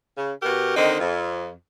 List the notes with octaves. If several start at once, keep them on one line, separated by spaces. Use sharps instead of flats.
C#3
B2 F#4 G4 A#4
D3 D#3 C4 D#4
F2